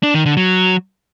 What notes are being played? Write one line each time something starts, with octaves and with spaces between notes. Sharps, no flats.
D4
D#3
D3
F#3